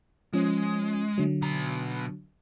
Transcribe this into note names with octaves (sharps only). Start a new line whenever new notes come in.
F3 G#3 C#4
D3 F#3
B2 A#5